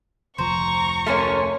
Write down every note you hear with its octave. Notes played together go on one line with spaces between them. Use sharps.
F1 D2 F3 C5 A#5 C#6
A3 A#3 C#4 C6 F6